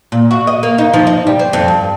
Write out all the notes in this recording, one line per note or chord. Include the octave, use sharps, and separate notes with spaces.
A#2
F#4
D#5
A#3
D#4
F3
D#4
G3
C5
F2
G2